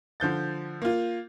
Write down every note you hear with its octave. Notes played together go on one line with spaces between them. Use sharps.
D3 F3 G6 A6
A#3 F4